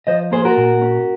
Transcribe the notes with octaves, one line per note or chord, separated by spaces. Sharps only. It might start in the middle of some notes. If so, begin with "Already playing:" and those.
F3 C5 D#5
A#3 G#4 C5
F#4 A#4
A#2
C#4